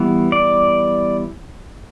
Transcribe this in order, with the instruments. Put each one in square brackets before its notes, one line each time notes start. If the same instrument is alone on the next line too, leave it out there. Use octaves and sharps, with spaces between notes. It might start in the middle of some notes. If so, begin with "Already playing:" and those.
Already playing: [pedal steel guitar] E3 G3 B3
D5